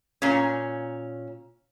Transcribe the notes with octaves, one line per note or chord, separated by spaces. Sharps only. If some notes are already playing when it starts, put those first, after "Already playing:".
A#2 C#4